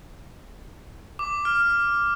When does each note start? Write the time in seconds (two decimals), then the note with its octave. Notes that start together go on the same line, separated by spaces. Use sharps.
1.19 D6
1.45 F6